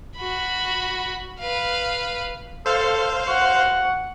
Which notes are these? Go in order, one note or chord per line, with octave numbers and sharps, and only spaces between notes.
F#4 B5
B4 F5
A4 C5 F5
F#4 F#5